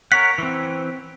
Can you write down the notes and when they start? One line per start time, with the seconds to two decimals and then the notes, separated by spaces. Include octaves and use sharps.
0.12 A#4 C#5 F#5 B6
0.38 E3 C4